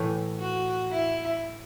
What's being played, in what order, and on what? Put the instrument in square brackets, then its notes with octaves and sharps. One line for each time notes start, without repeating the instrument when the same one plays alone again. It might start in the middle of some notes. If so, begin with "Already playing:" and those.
Already playing: [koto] A2 E3 A3
[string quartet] F#4
E4